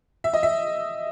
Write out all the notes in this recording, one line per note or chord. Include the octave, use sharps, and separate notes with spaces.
E5
D#5
E5